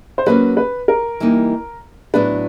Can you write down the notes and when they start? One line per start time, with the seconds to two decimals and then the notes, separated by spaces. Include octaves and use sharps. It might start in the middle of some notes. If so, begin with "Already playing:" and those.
0.18 C5
0.26 F#3 A#3 C#4 B4
0.57 B4
0.88 A#4
1.20 E3 G3 A#3 D#4
2.14 A2 F#3 B3 D4 B4